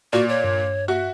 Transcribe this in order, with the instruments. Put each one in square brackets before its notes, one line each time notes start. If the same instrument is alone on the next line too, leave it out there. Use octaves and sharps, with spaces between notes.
[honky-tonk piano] A#2 [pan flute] F#4 [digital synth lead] D5
[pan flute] C#5
[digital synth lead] G2
[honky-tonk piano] F#4 [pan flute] E5